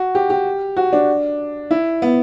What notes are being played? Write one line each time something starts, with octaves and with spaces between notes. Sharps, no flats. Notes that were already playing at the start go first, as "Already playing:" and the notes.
Already playing: F#4
G4
G4
F#4
D4
E4
B3